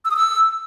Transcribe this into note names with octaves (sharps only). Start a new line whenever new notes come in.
E6
D#6
E6